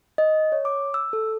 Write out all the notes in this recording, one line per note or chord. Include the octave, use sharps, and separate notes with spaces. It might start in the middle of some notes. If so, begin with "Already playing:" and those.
D#5
C#5
D6
E6
A4